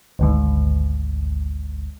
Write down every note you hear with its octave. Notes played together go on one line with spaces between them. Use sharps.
G#1 D2 G#2